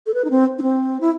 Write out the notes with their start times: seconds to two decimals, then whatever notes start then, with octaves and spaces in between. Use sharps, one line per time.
0.06 A4
0.14 B4
0.25 D#4
0.30 C4
0.59 D#4
0.62 C4
1.01 E4